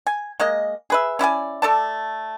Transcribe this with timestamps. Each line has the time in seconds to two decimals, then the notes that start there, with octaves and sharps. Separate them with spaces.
0.07 G#5
0.40 G#3 A#3 D#5
0.90 G#4 B4 E5
1.19 C#4 E4 D5 G#5
1.62 A3 A4 D5 A5